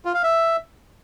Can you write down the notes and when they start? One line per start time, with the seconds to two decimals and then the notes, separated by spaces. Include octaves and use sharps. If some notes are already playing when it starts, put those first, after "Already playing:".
0.05 F4
0.14 F5
0.23 E5